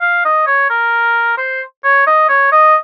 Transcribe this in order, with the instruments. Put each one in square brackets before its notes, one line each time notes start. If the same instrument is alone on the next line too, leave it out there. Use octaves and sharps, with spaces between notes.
[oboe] F5
D#5
C#5
A#4
C5
C#5
D#5
C#5
D#5